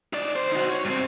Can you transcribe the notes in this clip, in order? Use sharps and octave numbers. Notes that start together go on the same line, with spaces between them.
D#4 D5
D2 C5
D#4 F#4
C#5
G2 C4